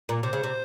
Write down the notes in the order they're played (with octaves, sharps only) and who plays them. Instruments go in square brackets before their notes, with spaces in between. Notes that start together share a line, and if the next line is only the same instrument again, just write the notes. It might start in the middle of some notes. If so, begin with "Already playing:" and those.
[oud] A#2
[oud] C3 [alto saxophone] C5
[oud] C#3
C3